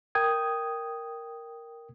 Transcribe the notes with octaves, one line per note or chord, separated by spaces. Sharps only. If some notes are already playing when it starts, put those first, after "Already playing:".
A#4 G5 D#6 G#6